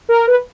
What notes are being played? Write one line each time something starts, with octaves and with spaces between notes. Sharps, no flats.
A#4
B4